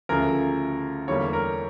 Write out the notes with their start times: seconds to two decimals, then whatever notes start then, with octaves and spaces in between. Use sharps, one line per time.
0.09 D2 C#3 F3 A3 A#4
1.08 E2 D3 G3 A#3 C#5
1.33 A#4